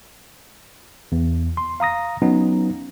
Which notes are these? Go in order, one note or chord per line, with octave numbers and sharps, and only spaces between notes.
E2
C6
F5 A#5 D#6 A#6
F#3 B3 C#4 D#4